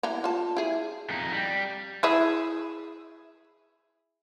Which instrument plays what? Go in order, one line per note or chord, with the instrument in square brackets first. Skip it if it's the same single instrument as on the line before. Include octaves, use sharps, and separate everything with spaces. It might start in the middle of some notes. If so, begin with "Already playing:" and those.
[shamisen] E3 B3 A#5
F4 A5
E4 G#4
[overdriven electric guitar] F2 D#4
G3
[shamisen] E4 G#4 E5